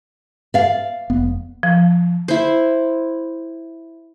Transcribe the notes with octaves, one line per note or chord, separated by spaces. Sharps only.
D5 F5
F1 B3
F3
E4 C5